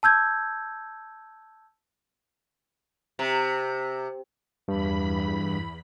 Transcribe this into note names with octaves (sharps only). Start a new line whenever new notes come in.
A5 E6 G6 G#6
C3
E2 G2 B5